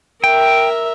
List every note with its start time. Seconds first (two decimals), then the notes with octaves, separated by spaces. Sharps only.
0.24 A#4 E5 G5